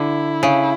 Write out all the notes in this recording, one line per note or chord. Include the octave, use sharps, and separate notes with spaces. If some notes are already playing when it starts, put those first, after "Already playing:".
Already playing: D3 E4
C#3